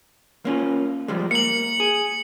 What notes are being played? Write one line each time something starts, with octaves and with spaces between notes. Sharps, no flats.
A#3 C#4 F4
F3 G3 G#3
A#3 C#7 F#7
G#4